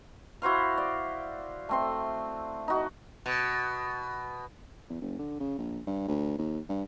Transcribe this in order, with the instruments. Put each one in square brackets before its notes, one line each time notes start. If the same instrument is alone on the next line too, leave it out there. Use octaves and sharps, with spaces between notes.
[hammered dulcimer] E4 F#4 C5 F5
D5
A3 C4 C6
D#4 F#4
[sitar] B2
[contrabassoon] E2
F#1
D3
C#3
A#1
G2
D2
D#2
G2